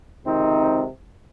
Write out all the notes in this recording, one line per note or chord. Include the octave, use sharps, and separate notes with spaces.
C#2 C3 D#3 C4 D#4